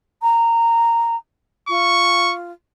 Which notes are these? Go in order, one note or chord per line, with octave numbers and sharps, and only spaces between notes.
A#5
F4 C#6